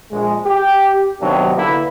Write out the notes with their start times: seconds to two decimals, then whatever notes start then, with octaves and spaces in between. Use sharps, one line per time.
0.11 A#1 G#3
0.46 G4
1.21 C3 D#3 F#3 A#3 B3 D4
1.57 D3 A#3 D4 E4 B4